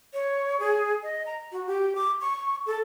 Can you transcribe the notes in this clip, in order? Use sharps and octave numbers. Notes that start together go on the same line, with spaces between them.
C#5
G#4
D#5
A#5
F#4
G4
D6
C#6
A4